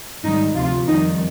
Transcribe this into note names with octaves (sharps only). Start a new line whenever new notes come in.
G#2 D#3 G3 D#4
D2 C3 F3 F4
F2 D#3 G3 D#4